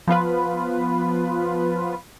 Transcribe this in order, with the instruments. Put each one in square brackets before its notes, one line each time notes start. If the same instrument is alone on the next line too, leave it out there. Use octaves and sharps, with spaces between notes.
[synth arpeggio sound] F3 B3 F4 B4